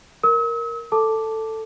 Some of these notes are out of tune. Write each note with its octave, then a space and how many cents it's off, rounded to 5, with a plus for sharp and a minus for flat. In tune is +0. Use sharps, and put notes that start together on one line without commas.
A#4 +0 E6 -45
A4 +10 A5 +0 D6 +0